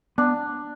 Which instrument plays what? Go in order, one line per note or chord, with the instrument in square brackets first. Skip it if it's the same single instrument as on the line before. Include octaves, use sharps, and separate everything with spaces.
[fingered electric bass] B3 [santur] D4